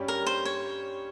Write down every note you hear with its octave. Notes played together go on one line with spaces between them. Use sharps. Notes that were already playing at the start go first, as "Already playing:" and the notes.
Already playing: G2 G3 C#4 G4
A#4
C5
C#5